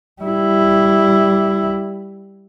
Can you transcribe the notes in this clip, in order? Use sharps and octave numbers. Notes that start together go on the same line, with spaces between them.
G3 E4